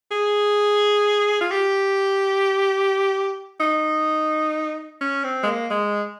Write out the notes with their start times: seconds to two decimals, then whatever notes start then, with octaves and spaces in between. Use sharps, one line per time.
0.11 G#4
1.41 F4
1.51 G4
3.60 D#4
5.01 C#4
5.24 C4
5.43 G#3
5.47 A#3
5.70 G#3